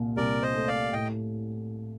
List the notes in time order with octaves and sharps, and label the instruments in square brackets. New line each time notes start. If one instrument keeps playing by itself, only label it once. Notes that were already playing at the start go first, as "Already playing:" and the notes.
Already playing: [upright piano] C2 A#2
[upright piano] C2 [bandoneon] A#4 D5
[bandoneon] C5 D#5
[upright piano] A3
[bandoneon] D5 F5
[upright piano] A2 [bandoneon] D#5 G5